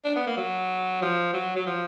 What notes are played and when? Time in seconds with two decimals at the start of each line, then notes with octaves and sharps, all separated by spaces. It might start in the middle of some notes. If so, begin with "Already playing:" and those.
0.05 D4
0.16 B3
0.27 A#3
0.37 F#3
1.02 F3
1.33 F#3
1.56 F#3
1.66 F3